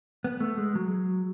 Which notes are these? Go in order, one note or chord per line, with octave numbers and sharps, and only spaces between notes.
B3
A3
G#3
F#3